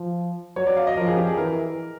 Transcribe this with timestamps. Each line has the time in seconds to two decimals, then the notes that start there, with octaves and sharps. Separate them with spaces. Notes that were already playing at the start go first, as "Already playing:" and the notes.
Already playing: F3
0.56 F#3 C#5
0.67 D5
0.77 F5
0.87 D#5
0.97 F3 A#4
1.07 G#4
1.17 G4
1.27 G#4
1.37 E3 A#4